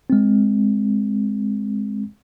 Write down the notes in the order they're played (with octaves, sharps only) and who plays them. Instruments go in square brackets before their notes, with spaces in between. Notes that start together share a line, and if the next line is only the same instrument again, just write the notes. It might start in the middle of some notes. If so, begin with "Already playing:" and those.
[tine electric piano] G#3 C4